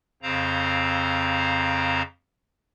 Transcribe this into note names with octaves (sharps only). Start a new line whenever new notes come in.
F2 C#3 C4 C5 F5 A#5